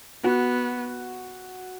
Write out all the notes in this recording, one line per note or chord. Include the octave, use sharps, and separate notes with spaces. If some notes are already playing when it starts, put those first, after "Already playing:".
B3 F#4